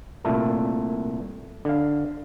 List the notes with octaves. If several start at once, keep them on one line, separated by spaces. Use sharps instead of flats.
C2 A#2 A3 A4
D3 F5